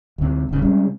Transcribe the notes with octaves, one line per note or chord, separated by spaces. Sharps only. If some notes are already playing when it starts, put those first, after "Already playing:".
D2 C3
D#1 C#3
C3 G3 G#3 C#4